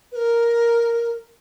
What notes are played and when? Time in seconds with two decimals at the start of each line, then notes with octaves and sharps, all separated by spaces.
0.12 B4
0.16 A#4